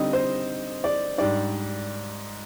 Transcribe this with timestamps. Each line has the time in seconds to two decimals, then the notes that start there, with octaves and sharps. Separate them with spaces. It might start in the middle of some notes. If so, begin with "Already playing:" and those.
Already playing: D3 G3 C4 D#4 D#5
0.13 C5
0.84 D5
1.18 G#2 G3 D4 D5